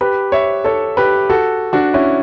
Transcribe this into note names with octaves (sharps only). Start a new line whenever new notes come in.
G4 B4
C#5 E5
A4 C#5
G4 B4
F#4 A4
D4 F#4
C#4 E4